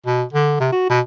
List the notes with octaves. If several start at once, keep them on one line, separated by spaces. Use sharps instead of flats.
B2
D3
C3
F#4
B2